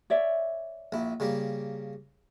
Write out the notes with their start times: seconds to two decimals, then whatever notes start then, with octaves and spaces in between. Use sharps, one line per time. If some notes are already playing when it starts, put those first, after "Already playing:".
0.10 C#5 D5 E5
0.92 A#1 E4
1.20 C#3 G3 A#3